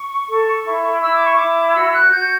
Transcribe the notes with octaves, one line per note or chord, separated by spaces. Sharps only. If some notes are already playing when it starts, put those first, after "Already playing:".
Already playing: C#6
A4
E4
E4 E6
D6
C#6
E4 D6
F#4 E6
F#6
F#4 G6